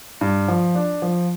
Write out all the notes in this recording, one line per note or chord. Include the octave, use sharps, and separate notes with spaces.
G2
F3
D4
F3